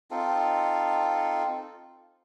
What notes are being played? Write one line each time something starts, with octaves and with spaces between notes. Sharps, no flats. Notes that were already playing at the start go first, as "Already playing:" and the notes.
C4 D#4 F4 A4